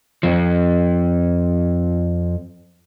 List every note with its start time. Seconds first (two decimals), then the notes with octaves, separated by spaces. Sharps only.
0.23 F2 F3